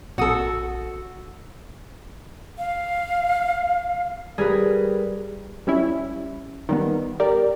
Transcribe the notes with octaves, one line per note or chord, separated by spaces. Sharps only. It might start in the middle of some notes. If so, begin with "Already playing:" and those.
A#1 F#4 A4 D#6
F5
G3 G#4 A#4 B4
G3 C#4 E4
D#3 G3 B3
G4 A#4 D5